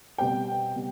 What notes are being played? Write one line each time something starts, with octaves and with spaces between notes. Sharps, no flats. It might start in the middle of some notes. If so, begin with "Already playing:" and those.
B2 G3 C4 G5
B2 G3